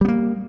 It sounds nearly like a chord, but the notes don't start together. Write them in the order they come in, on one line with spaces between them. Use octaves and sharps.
G3 B3 A#3